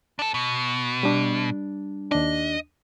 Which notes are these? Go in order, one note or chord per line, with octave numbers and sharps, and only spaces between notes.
D4 A4
B2
G3 D4
D#2 D4 D#5